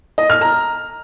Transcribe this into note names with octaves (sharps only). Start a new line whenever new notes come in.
D#5
F6
A#5